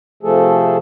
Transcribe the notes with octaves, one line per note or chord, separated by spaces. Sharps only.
C3 F3 A3 G#4 A4